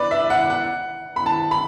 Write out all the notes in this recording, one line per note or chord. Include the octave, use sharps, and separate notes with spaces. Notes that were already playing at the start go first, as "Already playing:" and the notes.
Already playing: B4 D5
E5
F#5
F#5
B5
A5
B5